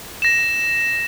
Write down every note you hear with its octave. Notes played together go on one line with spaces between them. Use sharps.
A#6 E7